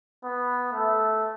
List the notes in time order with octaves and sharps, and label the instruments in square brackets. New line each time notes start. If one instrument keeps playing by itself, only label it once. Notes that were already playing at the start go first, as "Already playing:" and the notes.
[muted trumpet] B3
A3